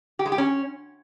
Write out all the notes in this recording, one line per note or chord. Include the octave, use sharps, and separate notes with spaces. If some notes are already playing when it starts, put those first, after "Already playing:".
G4
G#3
G4
C#4